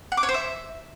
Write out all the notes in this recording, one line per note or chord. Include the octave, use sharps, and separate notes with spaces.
F#5
D6
C#5
C5
E5